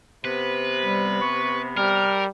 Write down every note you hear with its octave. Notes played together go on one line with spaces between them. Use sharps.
C3 B3 B4
G3
C#6
G3 A#4 F6